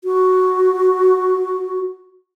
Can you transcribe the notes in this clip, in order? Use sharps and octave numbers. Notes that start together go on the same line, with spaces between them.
F#4